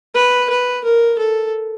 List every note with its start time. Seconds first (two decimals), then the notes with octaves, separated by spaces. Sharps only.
0.15 B4
0.50 B4
0.85 A#4
1.19 A4